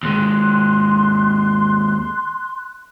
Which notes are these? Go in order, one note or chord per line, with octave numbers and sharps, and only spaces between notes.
D#2 G#3 C6 F#6